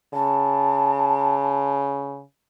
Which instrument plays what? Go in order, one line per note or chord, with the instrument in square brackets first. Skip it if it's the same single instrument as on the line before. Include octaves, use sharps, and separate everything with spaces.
[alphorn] C#3 [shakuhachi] A5